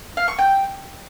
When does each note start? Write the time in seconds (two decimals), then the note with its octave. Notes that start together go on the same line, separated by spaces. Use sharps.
0.17 F5
0.28 C#6
0.39 G5